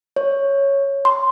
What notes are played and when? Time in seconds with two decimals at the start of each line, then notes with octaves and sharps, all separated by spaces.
0.16 C#5
1.05 C6